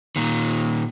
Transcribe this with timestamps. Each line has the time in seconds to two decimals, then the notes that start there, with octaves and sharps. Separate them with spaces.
0.16 A#2 D#3